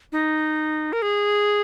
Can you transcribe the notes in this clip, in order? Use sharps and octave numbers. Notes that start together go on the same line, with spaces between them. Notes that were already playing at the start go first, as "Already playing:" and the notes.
D#4
A#4
G#4